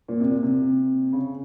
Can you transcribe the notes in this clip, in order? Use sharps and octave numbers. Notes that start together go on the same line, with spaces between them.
A#2
C3
A#2
C3
C#3